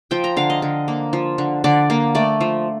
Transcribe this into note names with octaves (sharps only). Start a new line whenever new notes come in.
F3 G5
A#5
D3 F5
D#5
D3
A#3
F3
D3
D3 D5
A#3
A3 D5
F3